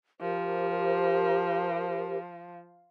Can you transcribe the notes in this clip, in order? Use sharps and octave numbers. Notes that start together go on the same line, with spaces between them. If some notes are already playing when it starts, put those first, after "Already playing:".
F3 G4 A#4 C5